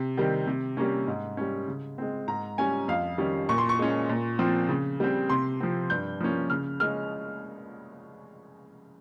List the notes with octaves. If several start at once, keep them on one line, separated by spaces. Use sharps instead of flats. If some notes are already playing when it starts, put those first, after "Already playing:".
Already playing: C3
D#3 G3 C4
C3
G3 A#3 C#4
G#2
G3 C#4
C#3
G#3 C4
G#2 A#5
G3 C#4 G#5
F2 F5
D#3 G3 C#4
A#2 C#6
C6
C#6
G#3 C#4
A#2
F3 C4
C#3
G3 C4
C3 C6
F3 C4
G2 G6
F3 A#3 C#4
C#3 F6
G#3 C#4 F6